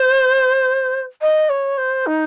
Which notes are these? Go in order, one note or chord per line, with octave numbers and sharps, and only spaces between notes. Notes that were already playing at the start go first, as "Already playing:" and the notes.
Already playing: C5
D#5
C#5
C5
D#4